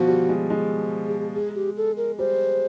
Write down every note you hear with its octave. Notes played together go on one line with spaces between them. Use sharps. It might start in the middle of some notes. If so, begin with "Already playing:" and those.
Already playing: B2 F3 F#4
G3
G#3
G#3
G#4
G#4
G4
A4
A#4
G3 C5